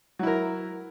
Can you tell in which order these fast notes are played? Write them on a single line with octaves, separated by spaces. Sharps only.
F#3 E4 A#4